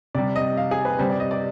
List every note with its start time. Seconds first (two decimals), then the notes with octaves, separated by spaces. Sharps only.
0.15 C3 G3 D5
0.36 D#5
0.57 F5
0.71 G#4
0.85 B4
0.99 C3 G3 C5
1.10 D5
1.20 D#5
1.31 D5